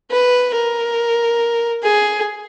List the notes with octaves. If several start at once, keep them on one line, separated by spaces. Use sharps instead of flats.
B4
A#4
G#4